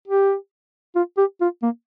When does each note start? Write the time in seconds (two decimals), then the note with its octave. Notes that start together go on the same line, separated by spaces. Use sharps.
0.08 G4
0.95 F4
1.18 G4
1.41 F4
1.63 A#3